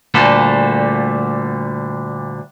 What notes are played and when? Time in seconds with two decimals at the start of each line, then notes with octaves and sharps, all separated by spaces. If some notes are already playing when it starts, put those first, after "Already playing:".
0.14 D2 A#2 D3 G3 A3 A4